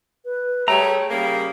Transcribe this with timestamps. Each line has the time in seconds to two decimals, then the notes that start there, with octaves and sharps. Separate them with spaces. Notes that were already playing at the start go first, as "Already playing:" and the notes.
0.25 B4
0.68 G3 A3 G#4 C#5 G5 A#5
1.11 C#3 G3 A#3